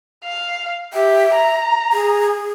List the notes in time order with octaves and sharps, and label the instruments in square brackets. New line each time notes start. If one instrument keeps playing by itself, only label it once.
[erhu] F5
[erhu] G4 [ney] E5
[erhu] A#5
[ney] G#4